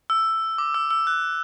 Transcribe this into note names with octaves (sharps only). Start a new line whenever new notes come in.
E6
D6
E6
E6
F#6